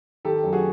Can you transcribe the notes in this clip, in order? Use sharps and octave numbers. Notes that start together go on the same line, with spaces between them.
D#3 G4 A4
F#2
F#4 G#4